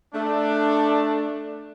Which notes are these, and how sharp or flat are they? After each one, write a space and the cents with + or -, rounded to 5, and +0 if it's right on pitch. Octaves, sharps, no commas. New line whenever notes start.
A3 +0 D4 +10